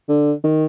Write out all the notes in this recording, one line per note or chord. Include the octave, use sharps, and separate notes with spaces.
D3
D#3